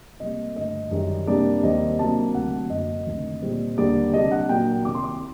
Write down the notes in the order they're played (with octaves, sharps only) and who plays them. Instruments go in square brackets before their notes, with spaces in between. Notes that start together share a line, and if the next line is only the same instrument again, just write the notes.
[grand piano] C3 G3 A#3 D#5
G2 D3 A3 D#5
F#2 D#3 G3
C3 G3 A#3 D4 D5
D#2 D#3 G3 C4 D#5
C3 F#3 A#3 D4 A5
D2 C3 F#3 F#5
F#2 F#3 A#3 D#5
D2 C3 D#3
A#2 G3 C4
D#2 D3 G3 A#3 D5
C3 G3 D4 D#5
F#5
A#2 F#3 A#3 D4 G5
C2 C3 D#3 D6
C6
D6